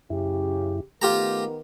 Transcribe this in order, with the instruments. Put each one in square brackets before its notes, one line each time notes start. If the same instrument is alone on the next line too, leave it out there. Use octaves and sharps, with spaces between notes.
[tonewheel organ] F#2 E4 [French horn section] C#3 G4
[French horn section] D#3 B3 A#4 [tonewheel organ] A3 [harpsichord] F4 G4 A#5